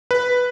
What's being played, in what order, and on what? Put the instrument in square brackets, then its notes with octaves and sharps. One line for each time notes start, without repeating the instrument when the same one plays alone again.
[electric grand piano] B4